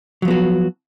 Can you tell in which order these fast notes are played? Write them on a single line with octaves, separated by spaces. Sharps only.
F#3 F3 B3 F#4